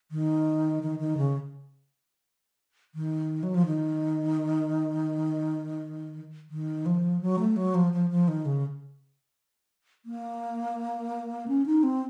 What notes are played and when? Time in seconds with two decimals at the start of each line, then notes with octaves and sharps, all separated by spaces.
0.11 D#3
0.83 D#3
0.99 D#3
1.17 C#3
2.95 D#3
3.43 F#3
3.54 F3
3.66 D#3
6.51 D#3
6.86 F3
7.21 F#3
7.39 A3
7.56 F#3
7.75 F3
7.93 F3
8.10 F3
8.28 D#3
8.45 C#3
10.06 A#3
11.48 C#4
11.66 D#4
11.83 C4